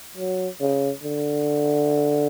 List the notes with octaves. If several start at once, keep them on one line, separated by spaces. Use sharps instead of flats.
F#3
C#3
D3